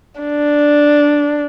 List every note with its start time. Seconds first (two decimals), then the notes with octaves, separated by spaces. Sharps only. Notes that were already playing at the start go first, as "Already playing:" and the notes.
0.21 D4